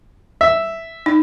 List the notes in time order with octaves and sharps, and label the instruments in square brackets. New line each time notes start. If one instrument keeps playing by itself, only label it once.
[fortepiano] E5
[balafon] D#4